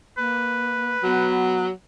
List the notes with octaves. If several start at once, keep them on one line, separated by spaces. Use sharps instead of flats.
A#3 B4
F#3 B3